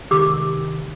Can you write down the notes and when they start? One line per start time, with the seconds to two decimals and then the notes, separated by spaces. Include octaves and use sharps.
0.11 C3 D#3 G4 D6 E6